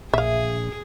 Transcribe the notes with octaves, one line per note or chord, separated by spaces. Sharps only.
A#1 G#4 E5 F5